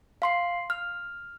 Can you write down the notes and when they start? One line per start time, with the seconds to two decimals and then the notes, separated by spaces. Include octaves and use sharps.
0.22 F5 C6 C7
0.70 F6